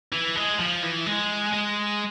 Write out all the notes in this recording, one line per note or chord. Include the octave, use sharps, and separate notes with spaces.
E3
G#3
F3
E3
G#3
G#3